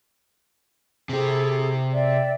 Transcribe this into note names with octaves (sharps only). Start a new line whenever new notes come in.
C3 C4 E4 G#4 A4
D5 E5 G5